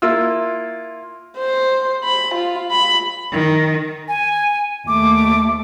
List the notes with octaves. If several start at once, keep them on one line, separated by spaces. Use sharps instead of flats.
A#3 E4 F4 E6
C5
B5
F4
B5
D#3
G#5
D#2 A3 D6